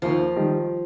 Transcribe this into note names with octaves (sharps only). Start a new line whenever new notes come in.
D#2 F3
D#3 G3